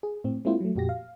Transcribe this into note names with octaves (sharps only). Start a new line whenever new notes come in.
G#4
A2 C4
G#3 A#3 C4 E4 F4 C5
F#3 A3
F2 A#2 F#4 G4 A#6
F5